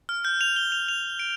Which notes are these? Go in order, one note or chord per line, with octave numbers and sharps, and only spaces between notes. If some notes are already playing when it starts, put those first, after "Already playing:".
F6
G6
F7
G7
F7
F7
D7